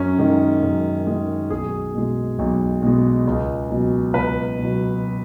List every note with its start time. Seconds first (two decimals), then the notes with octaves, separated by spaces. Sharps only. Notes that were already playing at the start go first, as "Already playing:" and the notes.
Already playing: F#2 C#4
0.19 D#3 G#3
0.63 F#2
1.07 D#3 G#3
1.50 B1 G#4
1.94 B2 G#3
2.39 B1
2.82 B2 G#3
3.27 C#2
3.70 B2 F#3
4.14 C#2 B4
4.59 B2 F#3